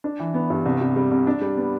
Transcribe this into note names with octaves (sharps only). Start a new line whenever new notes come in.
D4
E3
B3
G2
C2
C3
G3
C2
D4
G3
B3